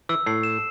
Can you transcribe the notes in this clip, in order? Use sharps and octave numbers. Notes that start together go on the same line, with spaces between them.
E3 E6
A2 C7
E7